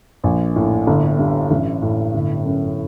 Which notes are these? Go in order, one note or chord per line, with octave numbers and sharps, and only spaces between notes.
A#1
A2
G1
G2
A1
A2
G1
F#2